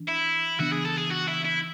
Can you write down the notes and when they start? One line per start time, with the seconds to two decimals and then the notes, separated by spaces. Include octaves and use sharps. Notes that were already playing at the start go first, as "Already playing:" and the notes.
Already playing: E3 D4
0.08 E4
0.59 C#3 E3 B3 D4 F#4
0.72 G#4
0.86 A4
0.98 G#4
1.11 F#4
1.28 E4
1.45 E4